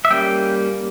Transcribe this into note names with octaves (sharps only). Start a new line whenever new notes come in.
E5
G3 A#3 C#4 G5